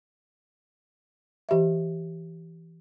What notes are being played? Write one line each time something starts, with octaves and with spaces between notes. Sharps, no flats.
E3 G4 D#5 E5